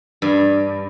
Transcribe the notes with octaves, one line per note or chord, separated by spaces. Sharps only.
G2